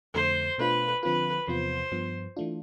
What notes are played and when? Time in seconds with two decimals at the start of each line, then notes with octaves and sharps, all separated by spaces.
0.14 F2 D3 A3 C5
0.58 B2 A3 D4 F4 B4
1.03 D3 F3 C4 F4 B4
1.48 E2 C3 F3 B3 F4 C5
1.92 G2 F3 B3
2.36 E3 A3 D4 F4